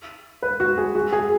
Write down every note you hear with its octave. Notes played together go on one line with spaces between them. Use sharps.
B4
F#4
G#4
F#4
G#4